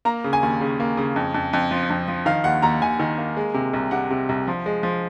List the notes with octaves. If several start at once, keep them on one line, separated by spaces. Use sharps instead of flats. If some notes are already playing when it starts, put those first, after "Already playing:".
A#3 A#5
C#3
G#5
D#2
C#3
A#3
C#3
F2
F2
F2
F3
F2
F3
D#3 F5
D#2 F#5
D#2 A#5
D#2 G#5
D#3
A#3
G#3
C3
C2
C3 F#5
C3
C2
F3
G#3
F3